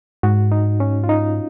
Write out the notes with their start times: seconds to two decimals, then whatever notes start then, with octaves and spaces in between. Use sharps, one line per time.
0.23 G#2 F#4
0.52 D#4
0.80 C#4
1.04 F4
1.09 D#4